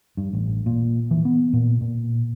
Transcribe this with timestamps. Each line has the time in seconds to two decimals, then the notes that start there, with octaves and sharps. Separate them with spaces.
0.17 G2
0.33 A1
0.66 A#2
1.11 E3
1.25 B3
1.53 A#2
1.81 A#2